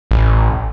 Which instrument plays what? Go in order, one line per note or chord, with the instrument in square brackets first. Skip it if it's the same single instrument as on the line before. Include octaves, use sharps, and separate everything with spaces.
[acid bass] A1